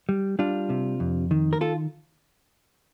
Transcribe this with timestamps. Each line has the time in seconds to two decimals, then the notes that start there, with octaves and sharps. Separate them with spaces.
0.09 G3
0.39 G3 D4 F4
0.70 C3
1.00 F2
1.31 D#3
1.53 A#4
1.61 F4 A4